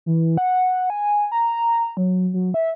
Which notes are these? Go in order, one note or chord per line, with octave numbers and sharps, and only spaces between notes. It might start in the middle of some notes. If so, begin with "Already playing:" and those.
E3
F#5
G#5
A#5
F#3
F#3
E5